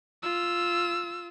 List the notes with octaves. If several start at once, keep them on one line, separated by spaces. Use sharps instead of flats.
F4 E6